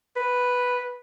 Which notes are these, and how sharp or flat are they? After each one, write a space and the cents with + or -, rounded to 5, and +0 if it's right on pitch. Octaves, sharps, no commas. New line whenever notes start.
B4 +0